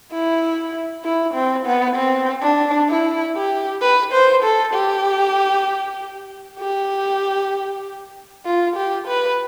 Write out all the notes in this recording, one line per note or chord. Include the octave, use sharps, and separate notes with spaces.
E4
E4
C4
B3
C4
D4
E4
G4
B4
C5
A4
G4
G4
F4
G4
B4